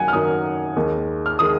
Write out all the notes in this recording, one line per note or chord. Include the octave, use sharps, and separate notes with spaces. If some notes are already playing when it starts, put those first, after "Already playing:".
Already playing: F#2 D#3 F#3 A#3 F#5 G#5
F6
F#2 D#3 F#3 A#3 D#6
D#2 D#3 G#3
F6
D#3 G#3 D#6